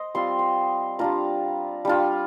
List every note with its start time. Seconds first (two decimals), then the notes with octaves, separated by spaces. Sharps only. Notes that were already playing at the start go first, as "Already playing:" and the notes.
Already playing: C5 D#5
0.15 G3 C4 F4 C6
0.39 C6
0.99 G3 D4 F4 A#5
1.85 G3 D4 F4